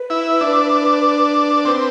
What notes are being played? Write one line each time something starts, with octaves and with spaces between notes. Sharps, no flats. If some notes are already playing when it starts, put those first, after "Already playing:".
Already playing: B4
E4
D4
C4 B4